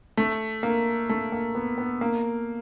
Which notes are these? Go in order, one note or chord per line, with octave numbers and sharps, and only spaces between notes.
A3
A#3
A3
A#3
B3
B3
A#3